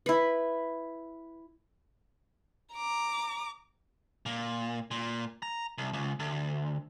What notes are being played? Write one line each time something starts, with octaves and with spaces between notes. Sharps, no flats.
E4 B4
A#5 D6
A#2
A#2
A#5
C2
C#2
D2